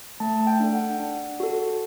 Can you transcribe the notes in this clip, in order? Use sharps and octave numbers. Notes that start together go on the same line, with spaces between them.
A3 A5
G5
D4 A4
F#5
D4
F#4 A4